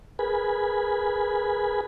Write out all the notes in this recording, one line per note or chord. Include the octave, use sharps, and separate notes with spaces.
G#4 A#4 B4 G#5 B5